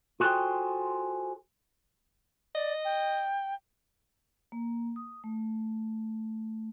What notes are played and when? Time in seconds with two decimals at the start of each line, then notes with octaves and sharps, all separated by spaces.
0.20 F4 F#4 G#4 A4 C5 G5
2.55 D5 D#5
2.85 G5
4.52 A#3
4.96 D#6
5.24 A3